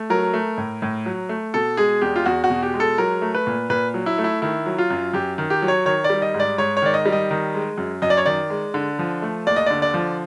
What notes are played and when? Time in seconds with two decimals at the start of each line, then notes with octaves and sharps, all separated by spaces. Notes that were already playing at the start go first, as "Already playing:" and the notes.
Already playing: A3
0.10 F#3 A#4
0.34 A3
0.58 A2
0.82 A2
1.06 F#3
1.29 A3
1.54 B2 A4
1.77 G#3 G#4
2.02 E2 G4
2.16 F4
2.26 E2 F#4
2.44 F#4
2.50 B2
2.63 G4
2.74 G#3
2.80 A4
2.98 F#3 A#4
3.22 A3
3.35 B4
3.47 A#2
3.70 A#2 B4
3.94 F#3
4.06 E4
4.18 A3
4.24 E4
4.42 D#3 E4
4.66 F#3
4.78 F4
4.90 F#2
5.13 F#2 G4
5.38 D#3
5.50 G4
5.62 F#3
5.68 C#5
5.86 D#3 C#5
6.04 D5
6.10 G3
6.22 D#5
6.34 G#2
6.40 D5
6.58 G#2 C#5
6.77 C#5
6.82 D#3 D5
6.94 D#5
7.06 G3
7.12 D#5
7.31 D#3
7.54 G#3
7.78 F#2
8.02 F#2 D#5
8.10 D5
8.17 C#5
8.26 D#3 D5
8.50 G#3
8.74 D3
8.99 F3
9.22 A3
9.47 D#2 D5
9.56 D#5
9.66 D3 D5
9.82 D5
9.94 F3